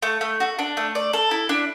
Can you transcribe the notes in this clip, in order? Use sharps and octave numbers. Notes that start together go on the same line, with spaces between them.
A3
A3
F#4
D4
A3
D5
A4
E4
D4